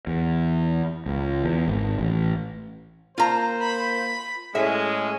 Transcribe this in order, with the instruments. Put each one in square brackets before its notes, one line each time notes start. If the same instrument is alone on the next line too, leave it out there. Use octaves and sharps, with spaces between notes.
[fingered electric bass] E2
C#2
E2
G#1
A1
[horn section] A#3 C5 [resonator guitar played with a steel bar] F4 A#5
[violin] B5
[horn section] A2 G#3 [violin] C#4 [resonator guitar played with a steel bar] E5